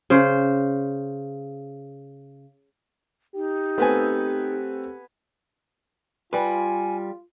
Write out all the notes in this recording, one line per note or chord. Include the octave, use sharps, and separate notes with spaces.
C#3 C5
D#4 G4
A3 B3 C4 A4 B4 G#5
G3 F4 B4 G#5